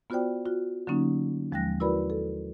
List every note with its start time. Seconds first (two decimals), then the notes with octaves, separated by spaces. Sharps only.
0.10 B3 F4 F#4 C5 D5 G5
0.46 F4 F#4
0.87 D3 F#3 A#3 C#4 D#4
1.52 D#2 F3 G#3 G5 F#6 A#6
1.80 E4 F#4 A#4 B4 D5 B5
2.10 A4